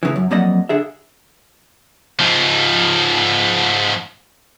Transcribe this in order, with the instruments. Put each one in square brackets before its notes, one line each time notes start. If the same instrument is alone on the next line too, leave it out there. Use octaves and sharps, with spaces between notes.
[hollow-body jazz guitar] A2 C#3 E3
F#2
F2 F#3 A#3 D5 D#5 F#5
D3 G#4 E5
[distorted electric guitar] G#2 F3